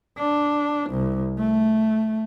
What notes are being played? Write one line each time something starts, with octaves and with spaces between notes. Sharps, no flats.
D4
C2
A3